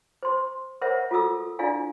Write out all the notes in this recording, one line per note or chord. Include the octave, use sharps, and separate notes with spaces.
C5 C6
A#4 C5 C#5 E5 F#5
F4 F#4 A4 D#6 E6
D4 E4 F4 D5 F5 G#5